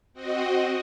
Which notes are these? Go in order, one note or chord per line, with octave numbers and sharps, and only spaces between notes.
C4 F#4 D#5